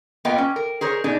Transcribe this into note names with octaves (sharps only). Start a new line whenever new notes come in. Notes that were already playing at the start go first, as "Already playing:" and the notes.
A#3 B3 F4 D#5 F5 G5
C#4
A#4
G#4 A#4 C5 C#5
B2 D4 D#4 G#4